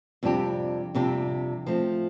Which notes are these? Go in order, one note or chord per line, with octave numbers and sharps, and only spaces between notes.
F2 C3 G3 D4 G4
F2 C3 G3 D4 G4
F3 A3 C4